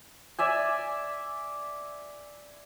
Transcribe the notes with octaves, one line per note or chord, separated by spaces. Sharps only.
D5 E5 G#5